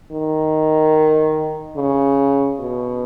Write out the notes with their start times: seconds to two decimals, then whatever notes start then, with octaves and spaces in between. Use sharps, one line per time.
0.11 D#3
1.76 C#3
2.59 B2